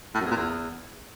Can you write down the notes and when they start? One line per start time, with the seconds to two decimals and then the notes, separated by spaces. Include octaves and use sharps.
0.15 A2
0.20 F#2
0.25 E2
0.30 A#2
0.36 E2